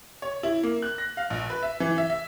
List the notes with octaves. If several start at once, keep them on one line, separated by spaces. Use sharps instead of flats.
C#5
E4
A#3
F#6
A#6
F5
A#1
B4
E5
E3
E5
E5